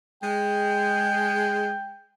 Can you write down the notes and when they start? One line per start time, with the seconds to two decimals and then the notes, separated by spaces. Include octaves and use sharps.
0.23 G#3 G5